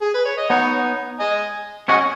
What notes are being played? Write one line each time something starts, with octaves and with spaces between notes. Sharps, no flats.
G#4
B4
C#5
D#5
B3 D#4 C#5 F#5
D#5 G#5
C#4 F#4 D#5 G#5